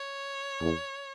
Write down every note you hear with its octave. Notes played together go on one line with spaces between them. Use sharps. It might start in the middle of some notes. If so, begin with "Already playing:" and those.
Already playing: C#5
E2